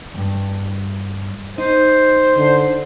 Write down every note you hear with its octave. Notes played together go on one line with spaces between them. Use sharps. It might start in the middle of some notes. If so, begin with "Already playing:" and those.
E2 G2
D#4 C5
D3